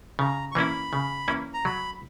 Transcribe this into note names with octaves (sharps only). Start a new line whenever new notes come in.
C#3 A#5
C#6
E3 A#3 C#4 E4 B5
C#3
E3 A#3 C#4 E4
A#5
F#3 B5